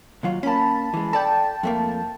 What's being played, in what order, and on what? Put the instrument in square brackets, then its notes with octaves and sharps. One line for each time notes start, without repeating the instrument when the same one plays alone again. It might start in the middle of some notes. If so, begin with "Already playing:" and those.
[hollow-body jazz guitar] D#2 F#3 F4
[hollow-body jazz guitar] A#3 C#4 [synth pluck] A5 B5
[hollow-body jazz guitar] E3 G#3
[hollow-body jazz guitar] A4 D5 [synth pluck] G5 A5
[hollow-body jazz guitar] F2 A3 A#3